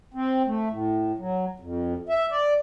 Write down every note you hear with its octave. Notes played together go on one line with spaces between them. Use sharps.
C4
A3
A2
F#3
F2
E5
D5